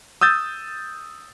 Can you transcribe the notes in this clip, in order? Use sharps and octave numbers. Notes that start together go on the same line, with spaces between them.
D#6 E6 G6 A6